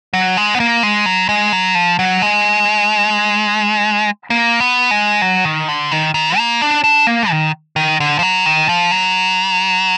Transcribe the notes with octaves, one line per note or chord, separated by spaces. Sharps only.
F#3
G#3
B3
A#3
G#3
F#3
G#3
F#3
F3
F#3
G#3
A#3
B3
G#3
F#3
D#3
D3
D#3
D#3
A#3
D4
D4
A#3
D#3
D#3
D3
F3
F#3
D#3
F3
F#3